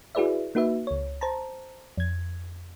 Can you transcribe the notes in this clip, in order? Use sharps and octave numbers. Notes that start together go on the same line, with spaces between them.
E4 F#4 G#4 B4 D5 E5
A#3 D#4 F#4 B4 E5
C#2 C#5
C5 A5 A#5
F2 G#6